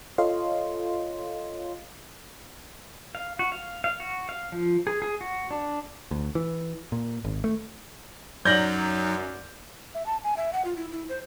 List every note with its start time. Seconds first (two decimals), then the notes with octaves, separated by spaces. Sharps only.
0.18 F4 A4 C#5 D#5 F5 C6
3.15 F5
3.39 F#4
3.52 F5
3.84 F5
4.00 F#4
4.29 F5
4.52 F3
4.87 G#4
5.02 G#4
5.21 F#4
5.51 D4
6.11 D2
6.35 E3
6.92 A#2
7.24 G#1
7.44 A3
8.45 F#2 F#3 D#4 D5 G6 A#6 F#7
9.94 E5
10.06 A5
10.24 G#5
10.37 E5
10.53 F#5
10.65 F4
10.76 E4
10.92 E4
11.09 C5